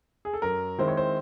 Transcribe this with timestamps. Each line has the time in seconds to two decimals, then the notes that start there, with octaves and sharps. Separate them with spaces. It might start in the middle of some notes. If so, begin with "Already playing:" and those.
0.25 G#4
0.33 A4
0.42 F#2 A#4
0.78 D#3 G#3 C4 E4 C5
0.88 C#5
0.97 C5